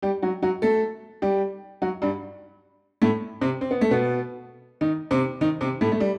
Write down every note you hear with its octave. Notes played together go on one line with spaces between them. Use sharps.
G3 G4
F#3 F#4
F#3 F#4
A3 A4
G3 G4
F#3 F#4
G2 G3
A2 A3
C3 C4
C4
B3
A3
B2 B3
D#3 D#4
C3 C4
D#3 D#4
C3 C4
A2 A3
A3
G3